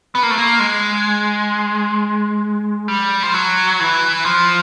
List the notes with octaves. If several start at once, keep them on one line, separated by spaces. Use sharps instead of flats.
B3
A#3
A3
A#3
G#3
G3
F3
F#3
E3
F3